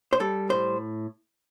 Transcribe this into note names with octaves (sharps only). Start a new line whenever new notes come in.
C5
G3 A4
A2 C5